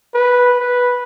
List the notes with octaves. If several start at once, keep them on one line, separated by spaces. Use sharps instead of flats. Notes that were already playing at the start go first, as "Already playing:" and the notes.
B4
B4